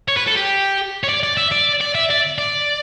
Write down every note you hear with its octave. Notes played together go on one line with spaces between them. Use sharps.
C#5
B4
A4
G4
C#5
D5
D5
E5
D5
D5
E5
D5
D5